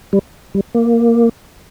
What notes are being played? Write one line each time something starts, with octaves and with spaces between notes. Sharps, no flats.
G3
G3
A#3